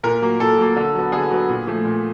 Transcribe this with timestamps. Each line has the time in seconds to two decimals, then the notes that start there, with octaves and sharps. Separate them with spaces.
0.03 A#2 A#4
0.22 F#3 A#3
0.40 A#2 A4
0.58 F#3 A#3
0.76 D3
0.95 F#3 B3
1.12 D3 G#4
1.31 F#3 B3
1.49 A#2
1.67 F3 A3
1.85 A#2